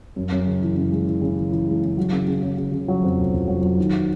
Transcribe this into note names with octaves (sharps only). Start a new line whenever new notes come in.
F#2
F#2
C#3
E3
C#3
G#3
E3
C#3
E3
E3
G#3
C#3
F#3
C#3
C#3
C#3
C#3
C#3
F#3
F2
F1
F1
F#3
F#3
D#3